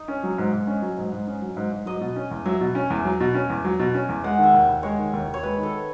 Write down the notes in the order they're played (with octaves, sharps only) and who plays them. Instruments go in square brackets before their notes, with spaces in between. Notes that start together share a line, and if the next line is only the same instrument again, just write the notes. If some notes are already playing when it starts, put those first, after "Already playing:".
Already playing: [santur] D#4
[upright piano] C#4
F#3
G#2
G#2
C#4
F#3
G#2
G#2
C#4
F#3
G#2
G#2
[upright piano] F#3 [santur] D#5
[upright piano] B2
C#4
E2
[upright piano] F#3 [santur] E5
[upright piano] B2
C#4
E2
F#3
B2
C#4
E2
F#3
B2
C#4
E2
[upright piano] G#3 [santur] F#5
[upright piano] D#3 [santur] E5
[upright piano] D#2
D#2
[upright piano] G#3 [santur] C#5
[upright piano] D#3
D#2
D#2
[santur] C#5
[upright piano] G#3 [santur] B4
[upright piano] D#3
[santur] A4